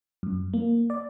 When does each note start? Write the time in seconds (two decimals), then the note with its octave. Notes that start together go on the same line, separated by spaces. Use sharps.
0.23 F#2
0.54 A#3
0.90 D5